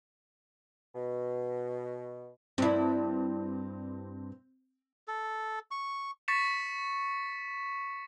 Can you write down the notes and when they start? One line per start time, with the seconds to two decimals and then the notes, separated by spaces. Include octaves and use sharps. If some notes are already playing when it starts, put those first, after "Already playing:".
0.95 B2
2.58 G2 C4 E4
5.08 A4
5.71 C#6
6.28 C#6 A6 B6 C#7 E7